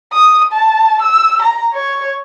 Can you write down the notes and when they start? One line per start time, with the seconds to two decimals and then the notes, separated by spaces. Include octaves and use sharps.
0.13 D#6
0.53 A5
1.02 E6
1.42 A#5
1.74 C#5